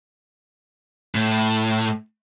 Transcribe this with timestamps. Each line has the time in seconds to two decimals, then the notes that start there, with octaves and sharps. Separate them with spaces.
1.15 A2